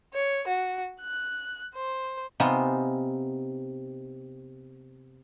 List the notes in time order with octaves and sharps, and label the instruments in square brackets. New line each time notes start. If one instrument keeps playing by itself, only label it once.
[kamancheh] C#5
F#4
F#6
C5
[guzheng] C3 B3 D#4 F4 C5 G#5